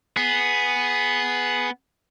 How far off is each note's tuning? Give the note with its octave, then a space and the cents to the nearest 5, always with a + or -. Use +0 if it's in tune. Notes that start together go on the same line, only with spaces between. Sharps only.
B3 +0 G#4 +0